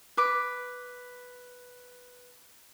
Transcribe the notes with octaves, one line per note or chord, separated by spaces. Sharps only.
B4 D6